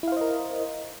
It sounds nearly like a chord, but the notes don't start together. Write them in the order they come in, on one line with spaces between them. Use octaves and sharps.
E4 F5 C5 D#5 A#4